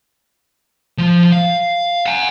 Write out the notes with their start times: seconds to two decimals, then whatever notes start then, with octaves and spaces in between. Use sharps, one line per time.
0.98 F3
1.32 F5
2.06 F#5 G#5